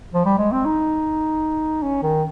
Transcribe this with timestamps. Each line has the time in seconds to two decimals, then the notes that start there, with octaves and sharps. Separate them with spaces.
0.14 F3
0.25 G3
0.38 G#3
0.52 C4
0.65 D#4
1.83 C#4
2.02 D#3